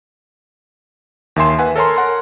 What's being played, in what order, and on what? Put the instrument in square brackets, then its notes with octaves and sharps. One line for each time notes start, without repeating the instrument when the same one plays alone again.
[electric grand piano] D#2 D#3 E5 G#5 C6 E7
B4 E5 F#5 G#5
A4 A#4 C#5 G#5 A#5 C6
A#4 F#5 C6